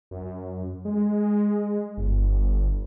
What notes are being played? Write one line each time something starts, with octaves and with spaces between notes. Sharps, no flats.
F#2
G#3
G1